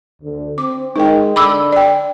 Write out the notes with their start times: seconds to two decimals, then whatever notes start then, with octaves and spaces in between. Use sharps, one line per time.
0.22 D2
0.58 C4 D6
0.96 G#3 D#4 A#4 G5
1.36 D3 D4 B5 D6 E6
1.73 D5 G5